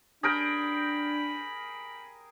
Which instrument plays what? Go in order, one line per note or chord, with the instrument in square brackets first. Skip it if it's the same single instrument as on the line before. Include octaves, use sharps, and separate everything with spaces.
[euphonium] D4 [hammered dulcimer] G#4 A#4 G5 [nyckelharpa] B5